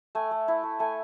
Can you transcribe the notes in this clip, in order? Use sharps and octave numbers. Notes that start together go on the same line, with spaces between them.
A3 G#5
A3
E4
A3
A3 G#5